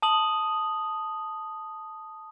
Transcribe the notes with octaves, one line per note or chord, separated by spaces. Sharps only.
A5 D#6 F#7